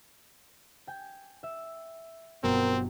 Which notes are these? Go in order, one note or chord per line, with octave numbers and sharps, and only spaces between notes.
G5 G#5
E5
G1 B2 F#3 C4 A#4 G5